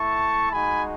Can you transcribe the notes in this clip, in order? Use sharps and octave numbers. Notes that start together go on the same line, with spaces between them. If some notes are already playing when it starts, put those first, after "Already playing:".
Already playing: A3 E4 A5 C#6
G#3 D#4 F#4 G#5 B5